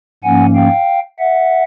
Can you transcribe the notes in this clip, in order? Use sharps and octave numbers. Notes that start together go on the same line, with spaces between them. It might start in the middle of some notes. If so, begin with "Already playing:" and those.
G#2 F3 A#3 C#4 F#5 G#5
F5 G5
E5 F#5